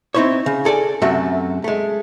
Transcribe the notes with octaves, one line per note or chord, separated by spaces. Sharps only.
C4 D#4 E4 C5 C#5
C#3
G#4 A4 D5 E5 G#5
F#2 C3 A3 F#4 E5
G#3 A3